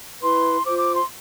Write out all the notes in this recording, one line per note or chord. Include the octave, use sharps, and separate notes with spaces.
E4 B4 C6
F4 C5 D6
D6
C6